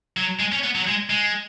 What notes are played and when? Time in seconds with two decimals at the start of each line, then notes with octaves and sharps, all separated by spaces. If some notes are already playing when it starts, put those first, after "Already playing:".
0.17 F#3
0.39 G#3
0.52 C#4
0.63 B3
0.75 F#3
0.87 G#3
1.10 G#3